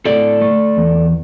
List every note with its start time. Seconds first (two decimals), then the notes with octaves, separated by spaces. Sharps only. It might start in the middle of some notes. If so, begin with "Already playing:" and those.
0.05 A2 A4 D5
0.42 A3
0.77 E2